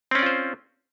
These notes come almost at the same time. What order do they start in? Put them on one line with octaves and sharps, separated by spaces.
C4 C#4 D5 F4 C5